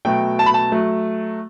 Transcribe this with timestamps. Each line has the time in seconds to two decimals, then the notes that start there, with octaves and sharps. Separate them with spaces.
0.05 B2 F#3 A3 G5
0.39 A5
0.46 B5
0.54 A5
0.72 F#3 A3